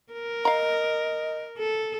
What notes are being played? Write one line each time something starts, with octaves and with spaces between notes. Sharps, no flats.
A#4
D#5 F5 A#5
A4